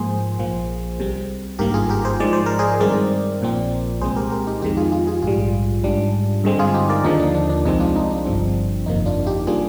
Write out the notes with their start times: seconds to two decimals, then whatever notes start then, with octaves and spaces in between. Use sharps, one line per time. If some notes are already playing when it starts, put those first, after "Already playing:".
Already playing: G#2 F3 A#3 G#4 C5
0.38 A#1 A#2 F3 A#3
0.99 C2 C3 G3 C4
1.59 G#1 G2 D#3 A#3 G4 A#4
1.74 F4 G#4
1.90 G4 A#4
2.05 G#4 C5
2.20 G#2 F3 G#3 D5
2.33 C5
2.46 A#4
2.59 G#4 C5
2.80 G2 D#3 G#3 C4 A#4 D5
3.41 A#1 A#2 F3 C4
4.01 C2 A#2 G#3 C4 G#4 C5
4.16 G4 A#4
4.32 G4 A#4
4.47 D#4 G4
4.62 F2 D#3 G#3 D#4 G4
4.77 F4 G#4
4.92 F4 G#4
5.07 F4 G#4
5.22 A#1 G#2 G3 F4 G#4
5.84 G#2 G3 D4
6.44 G2 D3 G#3 C4
6.59 F4 G#4
6.74 D#4 G4
6.89 A#4 D5
7.04 D#2 D3 F3 A#3 D4 D#4
7.20 D4
7.35 D4
7.49 D4
7.65 C2 C3 F3 G#3 C4 D#4
7.80 D4 F4
7.96 D#4
8.11 D4
8.26 G1 G2 F3 C4
8.86 G1 F2 C3 D#3 A#3 D#4
9.06 D4 F4
9.26 D#4 G4
9.47 G3 A#3 D4 F4 G#4